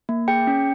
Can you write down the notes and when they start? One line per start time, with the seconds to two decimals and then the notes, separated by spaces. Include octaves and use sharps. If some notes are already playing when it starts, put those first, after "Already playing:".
0.09 A#3
0.28 G#4 G5
0.47 C#4